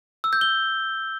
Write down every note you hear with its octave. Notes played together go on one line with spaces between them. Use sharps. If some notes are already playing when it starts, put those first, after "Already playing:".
E6
G6
G7